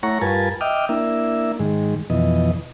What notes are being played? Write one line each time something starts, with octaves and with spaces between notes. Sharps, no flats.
A3 E4 C#5 F#5 A#5 C#6
G2 F4 A#4 B4 G#5 A5
D#5 E5 G5 D6 D#6 F6
A#3 D4 E4 E5
G#2 D#3 G#3
F2 B2 E3 D#5